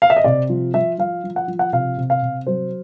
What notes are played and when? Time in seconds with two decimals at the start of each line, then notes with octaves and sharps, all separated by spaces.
0.02 F5
0.10 E5
0.17 D#5
0.24 C3 D5
0.49 F3
0.74 F3 E5
0.98 F3 F5
1.24 F3
1.36 F#5
1.48 F3
1.59 F#5
1.72 C3 F5
1.98 C3
2.10 F5
2.22 C3
2.47 F#3 C5